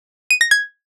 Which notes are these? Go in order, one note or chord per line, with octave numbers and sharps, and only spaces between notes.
D#7
A#6
G#6